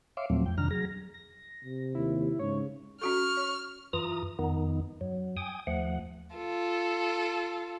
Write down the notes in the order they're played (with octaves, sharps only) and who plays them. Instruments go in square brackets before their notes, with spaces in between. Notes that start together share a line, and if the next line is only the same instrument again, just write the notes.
[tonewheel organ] C#5 E5 F5 C6 D6
D#2 A#2 F3 F#3 A3 C4
F2 G5
F2 C3 D#3 D4 A#5 F6
F#3 G#4 A#6
[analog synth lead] A#6
[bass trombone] C3
[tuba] D#2 [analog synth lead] E4
[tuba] G#2 [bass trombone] C#3 [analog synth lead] C#5
[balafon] C#4 F#4 A4 [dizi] C#6 [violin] F6
[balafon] C#5
[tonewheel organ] F#2 E3 F4 A#5 D#6
F2 D#3 B3 D#4
F#2 F#3
G5 G#5 D#6
D#2 F3 A3 F#5
[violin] F4 A4